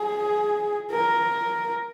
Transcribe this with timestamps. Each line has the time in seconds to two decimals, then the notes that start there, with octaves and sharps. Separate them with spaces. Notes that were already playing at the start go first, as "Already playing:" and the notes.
Already playing: G#4
0.91 A#4